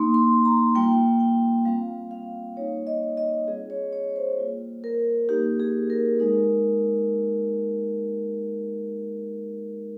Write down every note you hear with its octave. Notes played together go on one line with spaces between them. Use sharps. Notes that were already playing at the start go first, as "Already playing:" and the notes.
Already playing: A#3 D#4 C6
C6
A#5
G3 A#3 F4 G5
G5
G3 C4 F4 F5
F5
G3 A#3 D#4 C#5
D#5
D#5
G3 C4 F4 G#4
C#5
C#5
C5
G3 A#3 F4
A#4
A#3 D#4 G4
G#4
A#4
G#3 D#4 A#4